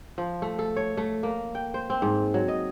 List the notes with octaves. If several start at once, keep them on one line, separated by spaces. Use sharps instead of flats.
F3
A3
A4
C#5
A3
A#3
G5
C5
C4
G#2
F#3
D#5